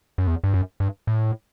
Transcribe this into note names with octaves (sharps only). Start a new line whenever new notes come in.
F#2
E2
G2
F#2
G2
A2